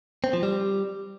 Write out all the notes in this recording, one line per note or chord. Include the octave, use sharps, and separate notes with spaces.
C4
F3
G3